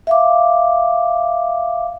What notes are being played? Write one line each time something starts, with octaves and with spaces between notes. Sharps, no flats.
E5 F5 D6